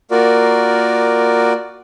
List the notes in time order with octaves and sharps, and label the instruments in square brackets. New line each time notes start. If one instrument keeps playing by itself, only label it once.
[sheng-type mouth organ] A#3 F4 F#4 A#4 D5